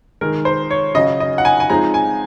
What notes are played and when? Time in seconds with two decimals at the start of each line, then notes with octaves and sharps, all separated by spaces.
0.21 D#3 G#3 D#4 A#4
0.45 C5
0.71 C#5
0.95 C#3 D#5
0.98 F#3 C#4
1.20 D#5
1.38 F#5
1.45 G#5
1.60 G#5
1.70 F3 G#3 C4 D#4 A#5
1.94 G#5